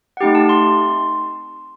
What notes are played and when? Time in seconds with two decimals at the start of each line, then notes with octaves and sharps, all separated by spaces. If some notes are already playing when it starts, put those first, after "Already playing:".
0.17 F#5
0.21 A3 C4 D#4 G4 G5
0.35 A5
0.49 C6